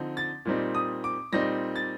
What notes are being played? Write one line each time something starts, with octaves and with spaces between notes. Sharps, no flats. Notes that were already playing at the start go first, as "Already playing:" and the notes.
Already playing: D3 F3 C4 D#4
A6
A#2 G3 C4 D#4
D#6
D6
A#2 G3 C4 D#4 A#6
A6